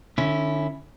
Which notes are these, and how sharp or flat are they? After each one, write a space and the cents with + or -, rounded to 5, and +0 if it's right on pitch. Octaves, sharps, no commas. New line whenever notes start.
D3 +40 C#4 +0 E4 +0